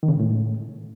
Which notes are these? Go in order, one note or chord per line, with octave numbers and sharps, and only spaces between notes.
D#3
C#3
G#2
A2